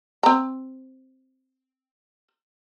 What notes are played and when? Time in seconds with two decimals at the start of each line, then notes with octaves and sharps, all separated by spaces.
0.23 C4 A#5